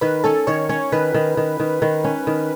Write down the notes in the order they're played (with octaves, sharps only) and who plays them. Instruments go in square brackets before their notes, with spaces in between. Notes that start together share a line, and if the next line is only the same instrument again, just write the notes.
[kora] D#3 [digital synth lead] B4
[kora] C#4 [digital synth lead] A4
[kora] D#3 [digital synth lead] C#5
[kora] C#4 [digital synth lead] C#5
[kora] D#3 [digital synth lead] B4
[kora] D#3
D#3
D#3
D#3
C#4
D#3